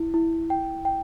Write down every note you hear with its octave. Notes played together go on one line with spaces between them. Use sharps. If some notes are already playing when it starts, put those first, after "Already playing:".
Already playing: E4
E4
G5
G5